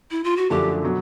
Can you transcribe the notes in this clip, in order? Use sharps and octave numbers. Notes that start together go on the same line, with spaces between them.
E4
F4
F#4
F#2 D3 F3 A3 D4 G4
B2 F#3